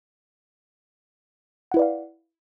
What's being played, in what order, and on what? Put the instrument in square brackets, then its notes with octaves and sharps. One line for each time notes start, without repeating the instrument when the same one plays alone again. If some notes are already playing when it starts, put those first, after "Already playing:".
[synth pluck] F#5
E4
B4
D5
F5